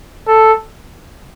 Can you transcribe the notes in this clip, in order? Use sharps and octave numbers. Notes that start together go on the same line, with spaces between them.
A4